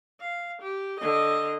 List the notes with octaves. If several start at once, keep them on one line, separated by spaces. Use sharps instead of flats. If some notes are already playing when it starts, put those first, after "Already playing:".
F5
G4
D3 D#5